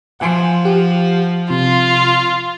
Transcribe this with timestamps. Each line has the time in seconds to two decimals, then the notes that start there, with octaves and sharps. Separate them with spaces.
0.20 F3 F#5 G#5 C6
0.65 G4 F#5
1.50 C3 F4